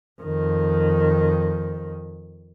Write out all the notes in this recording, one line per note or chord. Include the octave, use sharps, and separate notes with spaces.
F2 D#3